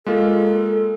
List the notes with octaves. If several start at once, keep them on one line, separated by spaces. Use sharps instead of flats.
G#3 A#3 F4 A4